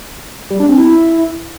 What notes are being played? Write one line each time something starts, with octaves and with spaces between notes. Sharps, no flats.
G3
D4
C4
E4